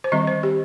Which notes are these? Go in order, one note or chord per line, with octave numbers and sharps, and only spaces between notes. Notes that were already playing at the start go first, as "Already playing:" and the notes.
C5
D#3 G3 C4 D#5
C5
G4